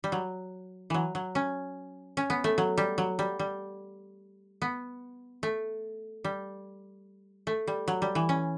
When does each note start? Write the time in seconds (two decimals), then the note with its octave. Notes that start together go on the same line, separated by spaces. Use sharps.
0.04 G3
0.12 F#3
0.90 E3 F#3
1.15 F#3
1.35 C#4
2.17 C#4
2.30 B3
2.44 A3
2.58 F#3
2.78 G3
2.98 F#3
3.19 G3
3.39 G3
4.62 B3
5.43 A3
6.24 G3
7.47 A3
7.67 G3
7.88 F#3
8.02 G3
8.15 E3
8.29 C#4